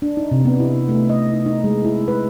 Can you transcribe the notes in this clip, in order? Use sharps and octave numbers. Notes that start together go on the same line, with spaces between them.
D4
D#4
C3
B3
E4
A3
D#5
D#4
D#4
G#3
E4
B4